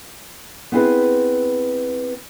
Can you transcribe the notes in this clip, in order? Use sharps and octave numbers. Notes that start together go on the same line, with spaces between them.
B3 C4 E4 G#4 B4